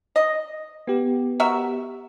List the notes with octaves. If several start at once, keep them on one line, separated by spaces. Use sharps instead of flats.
D#5
B3 G4
F#4 A#4 E5